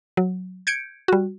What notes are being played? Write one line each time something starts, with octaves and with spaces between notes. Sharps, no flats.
F#3
G6 G#6 C#7 D7
G3 F#4